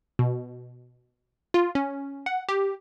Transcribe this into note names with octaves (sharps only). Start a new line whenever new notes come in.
B2
F4
C#4
F#5
G4